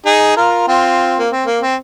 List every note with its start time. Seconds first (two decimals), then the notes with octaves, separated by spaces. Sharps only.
0.05 D#4 G#4
0.37 F4 A#4
0.68 C4 F4
1.19 A#3
1.31 C4
1.46 A#3
1.61 C4